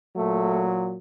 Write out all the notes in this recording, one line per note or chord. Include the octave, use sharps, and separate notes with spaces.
A#2 F#3 A3